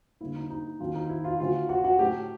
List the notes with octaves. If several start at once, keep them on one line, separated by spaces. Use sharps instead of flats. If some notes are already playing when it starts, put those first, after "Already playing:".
D2 D3 G3 A#3 E4
D#4
D#4
D#2 D#3 F#3 F4
D#4
E4
F4
D2 D3 F#3 A3 F4
F#4
F#4
A2 F#3 A3 G4